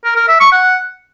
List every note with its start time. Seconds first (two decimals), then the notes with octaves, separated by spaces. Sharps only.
0.04 A#4
0.16 A#4
0.28 E5
0.40 C#6
0.52 F#5